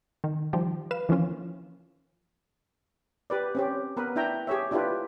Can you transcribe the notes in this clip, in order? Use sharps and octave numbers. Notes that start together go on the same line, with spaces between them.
D#3
D#3 F3 G3 G4
B4 F5 E7
E3 F3 A#3 C#4 F4
G4 B4 D5
C4 C#4 G4
B3 A#4 B4
D4 E4 E5 G5 A#5
G4 G#4 C#5 E5
D4 E4 F4 G4 B4